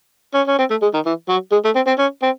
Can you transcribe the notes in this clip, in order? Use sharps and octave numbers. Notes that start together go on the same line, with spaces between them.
C#4
C#4
C4
A3
G#3
D#3
E3
F#3
G#3
A3
C4
C4
C#4
C4